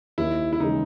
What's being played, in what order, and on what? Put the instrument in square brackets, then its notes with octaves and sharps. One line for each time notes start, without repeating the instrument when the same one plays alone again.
[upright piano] D#2 [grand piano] E4
[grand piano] E4
[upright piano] C#3 E3 G#3 [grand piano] D#4